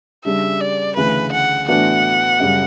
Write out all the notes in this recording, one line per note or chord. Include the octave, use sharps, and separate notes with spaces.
C#3 G3 D4 G4 E5
D5
D2 C#3 E3 B4
F#5
A2 E3 B3 D4 F#4 F#5
F#2 C#3 G3